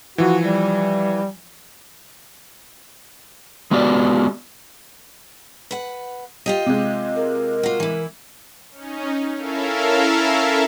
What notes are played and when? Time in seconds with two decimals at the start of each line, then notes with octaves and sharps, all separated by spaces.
0.18 E3 F3 F#4
0.41 G3
3.71 G#3 B3 F#4 G4 D5
5.71 B4 F#5
6.46 F4 G4 D#5
6.66 C3 G#3
7.16 A#4
7.63 F4 F#4
7.80 E3 E4
8.71 C#4 D#4
9.37 C#4 E4 A4 A#4 E5 F5